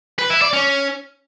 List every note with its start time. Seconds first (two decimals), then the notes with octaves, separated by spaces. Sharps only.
0.19 B4
0.30 E4
0.42 D5
0.53 C#4